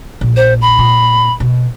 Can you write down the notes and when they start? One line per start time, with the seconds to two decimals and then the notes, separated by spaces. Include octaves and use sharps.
0.21 A#1
0.37 C5
0.62 B5
0.78 A#2
1.40 B2